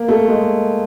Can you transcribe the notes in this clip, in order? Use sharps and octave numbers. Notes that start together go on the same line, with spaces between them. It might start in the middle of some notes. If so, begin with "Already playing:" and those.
Already playing: A#3
A3
G#3